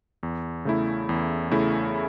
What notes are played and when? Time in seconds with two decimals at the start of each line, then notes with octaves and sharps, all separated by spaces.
0.23 E2
0.65 C#3 A3 E4
1.09 E2
1.51 C#3 A3 E4